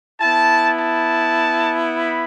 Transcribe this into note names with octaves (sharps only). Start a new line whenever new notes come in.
B3 E4 A5
A5
B5